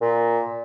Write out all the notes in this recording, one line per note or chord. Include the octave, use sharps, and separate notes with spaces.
A#2